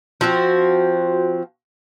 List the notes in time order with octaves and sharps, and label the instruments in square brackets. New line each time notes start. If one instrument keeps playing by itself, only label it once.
[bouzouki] F3 C4 F#4